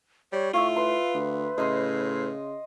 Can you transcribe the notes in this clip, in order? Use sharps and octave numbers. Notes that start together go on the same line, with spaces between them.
G3 C#5
A2 F4 E5 F5 C#6
B4 C6
D2
A2 C#3 D#5 C6